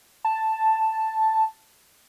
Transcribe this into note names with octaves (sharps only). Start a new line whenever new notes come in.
A5